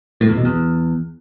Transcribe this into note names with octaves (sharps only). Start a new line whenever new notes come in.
A2
E2
B2
E2